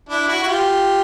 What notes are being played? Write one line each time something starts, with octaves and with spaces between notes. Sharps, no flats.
D4 E4
E4 F#4
F#4
F4 G4